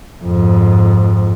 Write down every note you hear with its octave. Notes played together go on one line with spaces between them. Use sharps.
F2 G#2